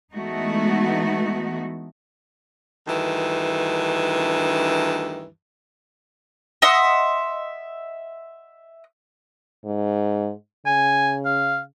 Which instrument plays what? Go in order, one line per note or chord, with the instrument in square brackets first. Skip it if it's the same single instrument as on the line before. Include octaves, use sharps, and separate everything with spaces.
[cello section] E3 G#3 A3 B3 D#4 F#4
[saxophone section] D2 G2 D#3 E3
[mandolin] D#5 E5 F#5 C6
[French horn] G#2
[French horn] C#3 [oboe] G#5
[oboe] F5